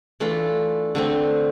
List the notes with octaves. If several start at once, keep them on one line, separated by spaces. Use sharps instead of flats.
E3 A3 D4 F4 A4
D3 A3 C4